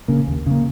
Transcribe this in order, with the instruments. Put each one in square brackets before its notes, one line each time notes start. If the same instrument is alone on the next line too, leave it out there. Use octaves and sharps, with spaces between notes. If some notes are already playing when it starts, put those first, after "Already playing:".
[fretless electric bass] C#3 A#3
D#2
C#3 A#3